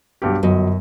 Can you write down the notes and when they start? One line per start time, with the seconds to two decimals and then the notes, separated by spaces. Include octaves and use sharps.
0.22 B1 G2 G4
0.43 G1 F#2 F#3 D#5